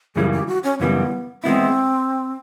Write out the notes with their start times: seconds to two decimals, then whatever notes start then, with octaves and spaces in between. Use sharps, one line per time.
0.16 F#2 C#3 E3 G3 G#4
0.32 G4
0.47 F#4
0.64 C#4
0.80 F#2 C#3 E3 G3 B3
1.44 E3 G#3 B3 C4 E4